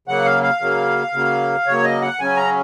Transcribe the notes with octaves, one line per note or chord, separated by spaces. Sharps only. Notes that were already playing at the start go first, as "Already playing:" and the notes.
C#3 F#3 A#3 F#5
F5
F5
C#3 F#3 A#3
C#3 F#3 A#3
C#3 F#3 A#3 C#5
D#5
F#5
C#3 F#3 C#4 G#5
A#5